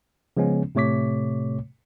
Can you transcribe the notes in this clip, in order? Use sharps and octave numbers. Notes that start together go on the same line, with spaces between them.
C#3 F3 G#3 B3 C#4
A2 C3 A3 C#5 D6 B6